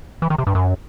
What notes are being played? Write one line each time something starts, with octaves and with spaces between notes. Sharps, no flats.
E3
D#3
C3
G2
F#2